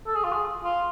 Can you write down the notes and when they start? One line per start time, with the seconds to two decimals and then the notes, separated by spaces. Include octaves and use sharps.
0.06 A4
0.15 G#4
0.24 F4
0.32 G#4
0.64 F4